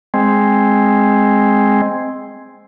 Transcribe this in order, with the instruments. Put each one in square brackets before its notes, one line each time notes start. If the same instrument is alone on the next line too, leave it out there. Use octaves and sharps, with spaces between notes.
[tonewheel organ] G#3 C4